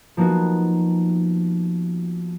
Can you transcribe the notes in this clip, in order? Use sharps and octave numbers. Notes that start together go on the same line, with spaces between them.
F3 A#3 B3 D#4 F#4